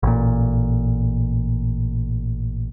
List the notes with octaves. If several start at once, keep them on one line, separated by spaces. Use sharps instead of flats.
A1 A#2